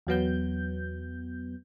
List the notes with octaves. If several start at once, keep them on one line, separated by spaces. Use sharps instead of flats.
E2 F#3 B3 G6